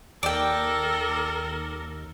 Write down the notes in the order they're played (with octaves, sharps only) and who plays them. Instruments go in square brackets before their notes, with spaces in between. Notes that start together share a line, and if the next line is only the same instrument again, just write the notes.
[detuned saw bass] D#2 [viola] A4 A#4 [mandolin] D5 G5